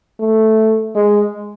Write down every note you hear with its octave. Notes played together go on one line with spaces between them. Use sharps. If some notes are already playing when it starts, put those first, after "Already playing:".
A3
G#3